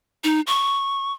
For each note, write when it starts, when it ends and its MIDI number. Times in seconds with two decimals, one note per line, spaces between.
0.24 0.41 63
0.47 1.12 85